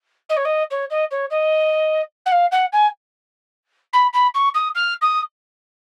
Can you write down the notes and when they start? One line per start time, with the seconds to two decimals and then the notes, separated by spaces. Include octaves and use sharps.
0.29 D#5
0.36 C#5
0.45 D#5
0.71 C#5
0.90 D#5
1.11 C#5
1.30 D#5
2.26 F#5
2.32 F5
2.51 F#5
2.73 G#5
3.93 B5
4.13 B5
4.34 C#6
4.54 D#6
4.75 F6
5.02 D#6